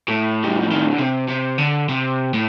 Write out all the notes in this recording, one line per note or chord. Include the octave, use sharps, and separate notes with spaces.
A2
G3
F3
D#3
D3
C3
C3
D3
C3
A2